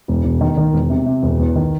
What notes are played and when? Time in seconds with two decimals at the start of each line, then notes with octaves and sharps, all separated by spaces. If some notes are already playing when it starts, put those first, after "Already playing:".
0.08 E1
0.25 E1
0.41 D#3
0.57 D#3
0.74 E1
0.90 C3
1.06 C3
1.23 E1
1.39 E2
1.56 D#3